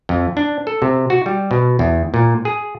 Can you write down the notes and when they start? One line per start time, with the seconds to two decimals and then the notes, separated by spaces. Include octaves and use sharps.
0.09 F2
0.37 D4
0.67 A4
0.82 C3
1.10 F#4
1.26 G3
1.51 B2
1.79 E2
2.14 A#2
2.45 G#4